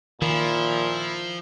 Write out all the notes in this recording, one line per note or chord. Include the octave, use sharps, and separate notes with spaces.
A#2 D#3 F3 E4